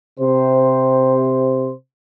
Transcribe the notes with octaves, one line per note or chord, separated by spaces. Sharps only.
C3 C5